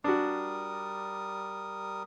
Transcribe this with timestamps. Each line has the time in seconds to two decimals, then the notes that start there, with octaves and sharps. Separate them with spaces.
0.04 G3 D4 F#4 A#4 D#6